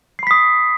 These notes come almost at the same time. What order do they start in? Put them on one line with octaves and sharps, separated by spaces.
C7 B5 B6 D#6